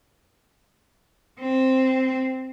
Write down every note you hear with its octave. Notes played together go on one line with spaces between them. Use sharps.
C4